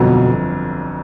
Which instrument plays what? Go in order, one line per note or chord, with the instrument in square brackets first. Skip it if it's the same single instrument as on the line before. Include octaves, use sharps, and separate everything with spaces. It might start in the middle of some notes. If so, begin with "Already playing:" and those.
Already playing: [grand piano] G1 F2 D3 F#3 [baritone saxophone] B2